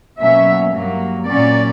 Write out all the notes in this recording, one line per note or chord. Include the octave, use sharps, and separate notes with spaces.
B2 F#3 A#3 C#4 E5
G2 F#3 A#3
A#2 F#3 C#4 D5